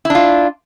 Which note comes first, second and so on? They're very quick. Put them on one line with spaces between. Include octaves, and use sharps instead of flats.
E4 D4 F4